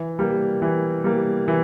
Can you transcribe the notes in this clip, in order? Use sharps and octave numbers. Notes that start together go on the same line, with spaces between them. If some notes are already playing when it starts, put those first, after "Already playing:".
Already playing: E3
G3 A#3
E3
G3 A#3
E3